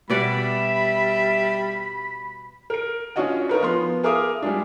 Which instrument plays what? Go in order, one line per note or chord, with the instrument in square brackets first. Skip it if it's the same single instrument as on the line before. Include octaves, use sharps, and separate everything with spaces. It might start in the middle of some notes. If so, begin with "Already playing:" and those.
[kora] B2 D5 F#5 [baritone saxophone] G3 [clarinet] E5 [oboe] B5
[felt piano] A#4 D7
C#4 D4 F4 F#4 D#5 F#5
D#4 F4 A#4 B4
F3 B3 C6
G#4 A#4 E5 F5 D6 D#6
G3 G#3 D4